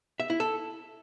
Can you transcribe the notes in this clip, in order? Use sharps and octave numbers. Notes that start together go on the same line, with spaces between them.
E5
E4
A4